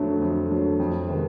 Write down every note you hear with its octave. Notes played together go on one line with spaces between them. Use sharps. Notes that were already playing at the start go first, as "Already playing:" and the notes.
Already playing: F2 D3 F#3 A3
F2
D3 F#3 A3
F2
C3 D#3 G#3 B3